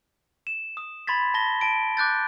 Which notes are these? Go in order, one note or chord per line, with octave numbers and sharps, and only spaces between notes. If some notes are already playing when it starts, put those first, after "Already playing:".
E7
D#6
B5 C6 G#6 A6 B6
A5 A#6 G7
A5 D7
D6 F#6 G6 A6